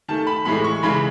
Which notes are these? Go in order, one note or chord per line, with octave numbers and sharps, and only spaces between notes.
D#3 A3 A5
B5
A2 E3 G#3 B5
C#6
C#3 E3 G#3 B5